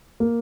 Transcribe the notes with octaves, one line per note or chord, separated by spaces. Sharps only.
A#3